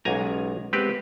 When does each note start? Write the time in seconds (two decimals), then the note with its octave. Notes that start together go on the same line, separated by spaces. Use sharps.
0.05 B1 C#3 G#3 F#5 G#5 A#5
0.73 G#3 B3 C4 G4 B4